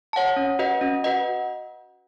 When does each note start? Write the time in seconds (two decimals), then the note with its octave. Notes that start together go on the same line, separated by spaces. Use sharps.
0.13 C#5 F#5 A5
0.36 C#4
0.59 F#4 B4 D#5 F#5
0.81 C#4
1.04 F#4 B4 D#5 F#5